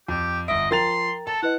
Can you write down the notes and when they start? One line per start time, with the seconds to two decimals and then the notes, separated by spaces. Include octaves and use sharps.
0.08 F2 G4
0.48 G1 D#5 E5 D7
0.71 F3 A#4 G5 A#5 C6 A6 F7
1.27 A4 A5
1.42 E4 B4 D#5 F#5